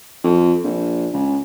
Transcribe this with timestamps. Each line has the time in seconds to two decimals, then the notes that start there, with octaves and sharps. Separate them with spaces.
0.24 F2
0.64 A#1
1.13 C#2